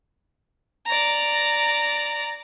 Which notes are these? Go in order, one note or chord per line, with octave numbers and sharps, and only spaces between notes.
D5 A#5